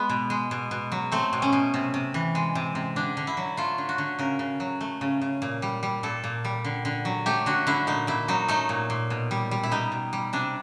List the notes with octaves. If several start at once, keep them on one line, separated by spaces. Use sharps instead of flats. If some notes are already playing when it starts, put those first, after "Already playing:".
Already playing: G#3 B3
B2
G#3
B2
B2
F#3
A3 C4
B2
C#4
B2
C3
C3
E3
G#3
C3
C3
D3 D4
D3
E4
F#3
A3 F4
D3
F#4
D3
C#3 A#4
C#3
F#3
A3
C#3
C#3
A#2
G3
G3
A#2 A4
A#2
G3
D3
D3
F#3
A3 G4
D3 F#4
D3 E4
A#2 D#4
A#2 E4
F#3 D#4
A3 D#4
A#2
A#2
B2
G3
G3
E4
B2 D#4
B2
G3
C3 D4